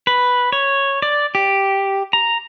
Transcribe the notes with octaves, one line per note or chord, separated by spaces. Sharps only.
B4
C#5
D5
G4
A#5